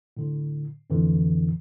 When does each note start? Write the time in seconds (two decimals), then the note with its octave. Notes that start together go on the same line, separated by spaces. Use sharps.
0.17 A2 D3
0.90 F2 A2 D3 E3